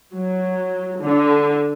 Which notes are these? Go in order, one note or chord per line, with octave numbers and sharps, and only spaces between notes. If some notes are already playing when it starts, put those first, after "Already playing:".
F#3
D3